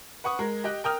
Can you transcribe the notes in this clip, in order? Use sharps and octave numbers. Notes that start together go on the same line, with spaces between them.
B4 F#5 C#6 D#6
G#3 A#4
G4 D#5 G5 F#6
A#4 G5 D#6 F6